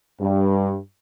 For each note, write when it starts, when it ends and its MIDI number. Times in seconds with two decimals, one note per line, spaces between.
0.21 0.76 43